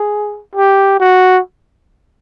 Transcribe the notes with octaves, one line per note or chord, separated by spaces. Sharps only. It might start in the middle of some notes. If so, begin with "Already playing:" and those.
Already playing: G#4
G4
F#4